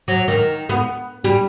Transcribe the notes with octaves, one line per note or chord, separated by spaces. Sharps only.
F#3
D#3
B3
G3